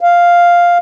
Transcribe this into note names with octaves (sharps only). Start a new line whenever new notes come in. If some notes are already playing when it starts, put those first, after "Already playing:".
F5